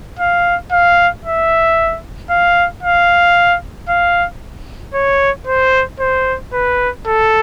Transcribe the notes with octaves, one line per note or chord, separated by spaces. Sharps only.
F5
F5
E5
F5
F5
F5
C#5
C5
C5
B4
A4